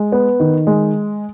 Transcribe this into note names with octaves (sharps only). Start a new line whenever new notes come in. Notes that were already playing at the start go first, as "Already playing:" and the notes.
Already playing: G#3
B3
D#3
G#3